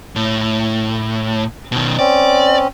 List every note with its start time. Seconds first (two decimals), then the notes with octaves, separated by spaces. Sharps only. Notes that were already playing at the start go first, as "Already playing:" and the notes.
0.16 A2
1.72 B2 D#3
1.99 C4 C#4 D5